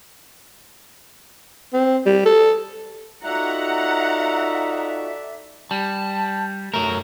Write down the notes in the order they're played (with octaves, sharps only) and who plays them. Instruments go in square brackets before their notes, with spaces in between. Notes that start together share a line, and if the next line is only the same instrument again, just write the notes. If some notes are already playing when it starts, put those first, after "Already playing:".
[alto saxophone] C4
G3
A4
[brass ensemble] D#4 F4 F#4 [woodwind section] A4 D5 E5 [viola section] F#5 A#5
[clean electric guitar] G3 [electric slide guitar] A5
[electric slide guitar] F#2 A3 [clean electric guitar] F#3 A#4